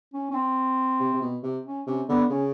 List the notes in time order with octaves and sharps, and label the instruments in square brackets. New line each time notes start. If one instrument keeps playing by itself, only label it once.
[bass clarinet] C#4
C#4
C4
[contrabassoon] C3
C3
B2
C3
[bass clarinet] C#4
[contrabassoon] C3 [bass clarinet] C#4
[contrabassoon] D3 [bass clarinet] B3
[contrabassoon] C#3 [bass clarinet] C#4